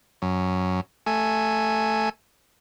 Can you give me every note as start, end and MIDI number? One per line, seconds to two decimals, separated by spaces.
0.22 0.81 42
1.06 2.09 57
1.06 2.09 80